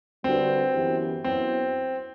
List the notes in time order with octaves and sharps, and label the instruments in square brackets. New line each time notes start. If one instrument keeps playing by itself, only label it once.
[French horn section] D3 G3 D4 F#4 B4 [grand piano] C4
[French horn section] F#2 E3 B3 E4 G4
[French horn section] F#2 F#3 B3 E4 [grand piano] C4